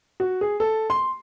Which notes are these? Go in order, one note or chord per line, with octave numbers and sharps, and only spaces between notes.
F#4
G#4
A4
C6